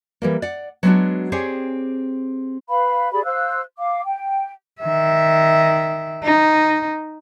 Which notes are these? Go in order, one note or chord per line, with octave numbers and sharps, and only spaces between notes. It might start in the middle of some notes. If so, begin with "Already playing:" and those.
E3 G3 A#3
D5 F#5
F#3 G#3 B3 C#4 D4 F#4
C4 G4 G#4 C#5 D5
B4 F5 B5
G4 G#4 D5 B5
C5 F5 E6 F#6
F5 D6
G5
D#3 E5
D#4